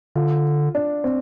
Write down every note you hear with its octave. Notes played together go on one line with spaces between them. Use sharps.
D3 F4
D4
C4